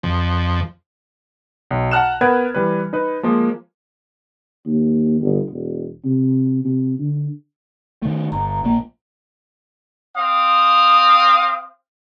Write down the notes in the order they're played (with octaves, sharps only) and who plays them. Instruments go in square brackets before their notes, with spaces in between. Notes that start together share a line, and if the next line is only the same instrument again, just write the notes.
[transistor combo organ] F2
[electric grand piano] B1
F#5 A5 A#5 F6 F#6 E7
B3 A#4 B4 F#5 B5 G#6
E3 G3 B4
D#4 B4
F3 G#3 A#3
[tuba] D#2
G1
E1
C3
C3
D3
[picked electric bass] D#3 A3
[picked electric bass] G1 [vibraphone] A#5
[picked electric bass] A#1 A#3
[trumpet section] C4 F5 D#6